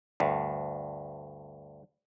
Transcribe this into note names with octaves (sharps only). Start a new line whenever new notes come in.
D2 G2